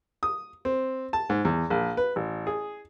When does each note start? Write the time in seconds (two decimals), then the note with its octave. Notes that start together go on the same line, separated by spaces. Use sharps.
0.23 D#6
0.65 C4
1.13 A5
1.30 G#2
1.45 E2
1.70 A#1
1.97 B4
2.16 A1
2.47 G#4